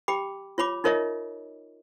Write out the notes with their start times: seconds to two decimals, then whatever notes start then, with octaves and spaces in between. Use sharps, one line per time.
0.08 G4 G5 B5 D6
0.58 F4 C#5 B5 D6
0.84 D#4 F4 A#4 C#5 D#5 E5